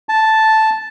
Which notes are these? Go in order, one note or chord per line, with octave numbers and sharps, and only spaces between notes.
A5